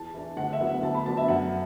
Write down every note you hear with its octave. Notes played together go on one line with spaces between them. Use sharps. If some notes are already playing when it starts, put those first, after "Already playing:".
Already playing: E2 A5
E3 D4
D2 F#5
E5
D3 F#3 B3 E4
F#5
D2 A5
B5
D3 F#3 B3 D4 A5
E5
F#2 F#5